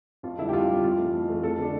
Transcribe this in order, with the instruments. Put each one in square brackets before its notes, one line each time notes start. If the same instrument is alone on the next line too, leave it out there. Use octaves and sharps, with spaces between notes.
[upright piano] F2 F4
D3 E4
G3
G4
F2 F4
D3 G3
F2 F4
E3 A3
F2
E3 A3
F2 A4
D3 A3 D4